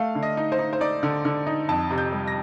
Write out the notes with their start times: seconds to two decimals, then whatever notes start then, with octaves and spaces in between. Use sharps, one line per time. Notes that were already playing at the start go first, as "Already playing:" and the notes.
Already playing: A3 F5
0.15 D3
0.23 D#5
0.37 D#4
0.52 C5
0.59 D#4
0.73 C5
0.81 D#4 D5
1.03 D3
1.25 D3
1.47 D#4
1.69 F2 A5
1.91 C3
1.98 G6
2.12 G3
2.28 A#6